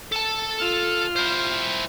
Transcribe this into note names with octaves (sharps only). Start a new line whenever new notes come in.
A4 A5
F4 F6
E4 C5